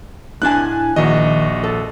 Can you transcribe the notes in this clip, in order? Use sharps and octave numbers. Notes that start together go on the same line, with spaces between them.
A2 D4 G#5 A5 F#6
A#1 D#3 F#4 D#5
A4